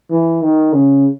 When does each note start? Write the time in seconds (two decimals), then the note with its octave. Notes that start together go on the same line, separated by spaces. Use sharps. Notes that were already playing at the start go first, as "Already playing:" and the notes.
0.10 E3
0.42 D#3
0.72 C#3